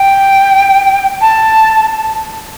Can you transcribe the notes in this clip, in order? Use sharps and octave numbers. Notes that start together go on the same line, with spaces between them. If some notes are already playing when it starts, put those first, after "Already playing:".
Already playing: G5
A5